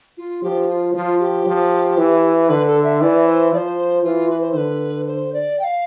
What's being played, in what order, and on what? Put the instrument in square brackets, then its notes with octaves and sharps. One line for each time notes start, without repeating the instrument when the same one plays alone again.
[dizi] F4
[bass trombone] F3 [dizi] G4
[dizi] F4
[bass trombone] F3 [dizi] F4
[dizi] G4
[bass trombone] F3
E3
[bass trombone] D3 [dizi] B4
[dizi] A4
E5
[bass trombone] E3 [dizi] D5
[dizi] C5
[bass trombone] F3 [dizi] D5
[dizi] C5
[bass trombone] E3 [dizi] F4
[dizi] B4
C5
C5
[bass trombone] D3 [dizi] B4
[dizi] C5
D5
G5
F5